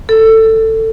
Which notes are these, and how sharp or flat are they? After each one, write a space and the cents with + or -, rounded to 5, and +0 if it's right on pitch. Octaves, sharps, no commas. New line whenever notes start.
A4 +15